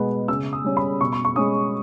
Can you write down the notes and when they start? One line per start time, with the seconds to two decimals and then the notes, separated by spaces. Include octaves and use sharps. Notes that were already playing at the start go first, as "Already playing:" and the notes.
Already playing: B2 G#3 B3
0.28 C#3 E6
0.53 D#6
0.64 G3 C#4
0.77 B5
1.01 B2 C#6
1.13 B5
1.25 C#6
1.36 G#3 C#4 D#6